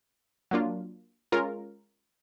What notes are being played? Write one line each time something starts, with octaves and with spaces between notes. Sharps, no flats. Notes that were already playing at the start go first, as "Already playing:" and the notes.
F#3 A#3 D4 F4
G#3 C#4 F4 A#4